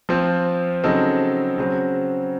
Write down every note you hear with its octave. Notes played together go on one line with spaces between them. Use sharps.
F3 C4 F4
C#3 F#3 C4 D#4 A4
C#3 F#3 C4